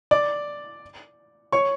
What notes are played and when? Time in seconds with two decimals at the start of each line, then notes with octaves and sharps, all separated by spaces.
0.11 D5 D6
1.52 C#5 C#6